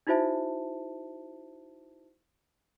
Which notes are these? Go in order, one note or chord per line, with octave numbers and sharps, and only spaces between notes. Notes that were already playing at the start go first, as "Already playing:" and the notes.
D#4 E4 F#4 C5 E5 A5